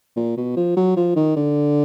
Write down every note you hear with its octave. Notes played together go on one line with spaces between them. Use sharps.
A#2
B2
F3
F#3
F3
D#3
D3